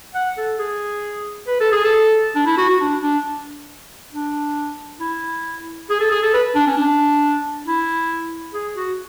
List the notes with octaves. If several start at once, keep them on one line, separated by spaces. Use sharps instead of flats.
F#5
A4
G#4
B4
A4
G#4
A4
D4
E4
F#4
F#4
D4
D4
D4
E4
G#4
A4
G#4
A4
B4
D4
C#4
D4
E4
G#4
F#4